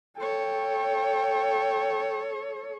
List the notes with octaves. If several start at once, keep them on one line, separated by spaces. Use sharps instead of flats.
A4 C#5 G5